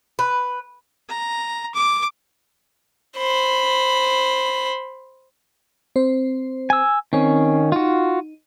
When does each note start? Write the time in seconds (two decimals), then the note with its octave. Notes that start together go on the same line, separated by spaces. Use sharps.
0.19 B4
1.09 A#5
1.75 D6
3.17 C5 B5
5.96 C4 C5
6.70 G#5 E6
7.13 D#3 C4 C#4
7.72 D#4 F4 F#4